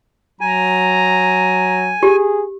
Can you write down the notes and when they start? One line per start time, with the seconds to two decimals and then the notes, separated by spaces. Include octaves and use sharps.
0.41 F#3 G#5 A#5
2.03 G4 G#4